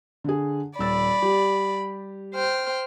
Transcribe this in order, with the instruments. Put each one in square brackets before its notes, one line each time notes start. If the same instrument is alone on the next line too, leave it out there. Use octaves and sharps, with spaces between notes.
[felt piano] D3 G#4
[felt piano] D#1 E6 A6 [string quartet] D5 B5
[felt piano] G3 G4
[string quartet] C5 G5 F6